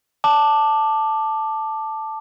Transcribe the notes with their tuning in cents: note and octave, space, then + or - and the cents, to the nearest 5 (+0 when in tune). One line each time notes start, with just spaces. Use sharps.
A5 +0 D6 +15